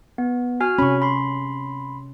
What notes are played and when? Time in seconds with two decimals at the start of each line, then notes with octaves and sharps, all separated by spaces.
0.18 B3
0.60 F#4 G#5 F6
0.78 C3 C#4 B5 C#6
1.02 B5 C6